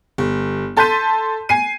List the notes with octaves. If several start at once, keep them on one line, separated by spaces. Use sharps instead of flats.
G1
A4 A5 C6 G6 B6 D#7
G#5 C7 D#7